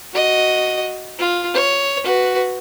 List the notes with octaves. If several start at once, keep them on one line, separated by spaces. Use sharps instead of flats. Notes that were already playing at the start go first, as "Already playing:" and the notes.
F#4 D#5
F4
C#5
F#4 B4